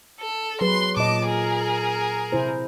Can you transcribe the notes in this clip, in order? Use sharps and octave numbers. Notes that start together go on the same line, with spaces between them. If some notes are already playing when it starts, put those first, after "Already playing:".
A4
F#3 G#4 B4 C6
A#2 D#5 A5 D6
G#4 A#4
C3 E4 C5